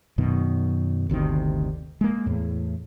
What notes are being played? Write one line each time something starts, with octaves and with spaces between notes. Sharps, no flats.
F#2 B2 D#3
G1 D2 C3 D#3
G#3 A#3
E2 A2